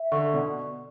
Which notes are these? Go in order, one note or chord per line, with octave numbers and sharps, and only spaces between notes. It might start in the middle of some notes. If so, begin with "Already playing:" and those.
Already playing: E5
D3 C#6
B2 D5